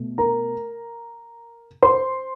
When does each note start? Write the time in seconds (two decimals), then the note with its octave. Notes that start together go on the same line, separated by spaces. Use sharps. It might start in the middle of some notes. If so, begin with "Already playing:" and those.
Already playing: B2 A3
0.18 A#4 A#5
1.82 C5 C6